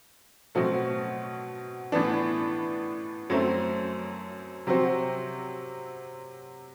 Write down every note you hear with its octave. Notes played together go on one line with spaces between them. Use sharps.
B2 F#3 A3 C4 F#4
A2 E3 B3 D4
F#2 F#3 A3 C4
C3 F#3 C4 F#4 C5